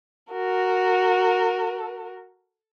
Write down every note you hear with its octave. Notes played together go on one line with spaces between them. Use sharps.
F#4 A#4